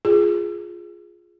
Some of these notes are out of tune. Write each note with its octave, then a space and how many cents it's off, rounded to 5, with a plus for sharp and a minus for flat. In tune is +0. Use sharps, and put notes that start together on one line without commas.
F4 +0 G#4 +0